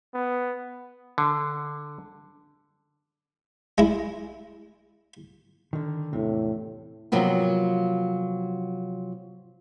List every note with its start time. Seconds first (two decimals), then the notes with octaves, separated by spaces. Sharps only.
0.14 B3
1.18 D3
3.78 G#3 E4
5.73 D3 D#3
6.13 E2 A2 C3
7.12 C3 F3 F#3 A#3 B3 F4